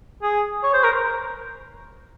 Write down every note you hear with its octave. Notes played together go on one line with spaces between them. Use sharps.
G#4
C#5
C5
A#4